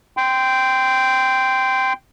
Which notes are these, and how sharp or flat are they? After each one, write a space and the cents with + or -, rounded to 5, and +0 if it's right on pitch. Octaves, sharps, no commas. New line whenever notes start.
G5 +0 C6 -20